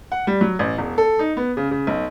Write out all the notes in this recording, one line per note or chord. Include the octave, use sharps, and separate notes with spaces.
F#5
G3
F#3
A1
E1
A4
D#4
B3
C#3
C#3
B1